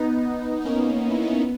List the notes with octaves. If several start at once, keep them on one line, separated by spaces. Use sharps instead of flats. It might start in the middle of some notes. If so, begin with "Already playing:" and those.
Already playing: B3 D#4
D#4
A#3 C#4
E4
D#4
C#4
B3